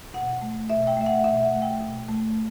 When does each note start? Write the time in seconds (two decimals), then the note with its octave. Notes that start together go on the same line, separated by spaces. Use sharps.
0.14 B2 F#5
0.41 A3
0.69 B2 E5
0.87 G5
0.97 A3 E5
1.06 F#5
1.24 B2 E5
1.43 F#5
1.53 A3
1.62 G5
1.81 B2
2.08 A3